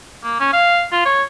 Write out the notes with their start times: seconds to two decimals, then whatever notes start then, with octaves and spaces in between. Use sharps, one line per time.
0.24 A#3
0.40 C#4
0.53 F5
0.93 F4
1.06 C#5